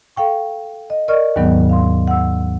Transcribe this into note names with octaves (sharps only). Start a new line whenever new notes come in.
A4 F5 G5 C#6
D#5
A#4 D5 D#5 C#6 F6
D#2 G#2 D#3 F#3 B3
F5 C6
F#5 E6